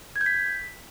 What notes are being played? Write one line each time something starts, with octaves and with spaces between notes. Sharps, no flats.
G#6
G6
B6